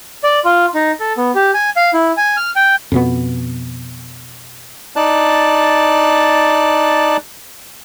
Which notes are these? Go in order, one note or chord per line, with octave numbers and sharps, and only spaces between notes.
D5
F4
D#4
A4
B3
G4
G#5
F5
E4
G#5
F6
G5
F2 B2 B3
D#4 D5 A5 F#6